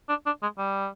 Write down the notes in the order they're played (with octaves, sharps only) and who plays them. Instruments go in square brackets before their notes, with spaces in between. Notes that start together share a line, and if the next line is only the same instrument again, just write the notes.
[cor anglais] D4
D4
G#3
G3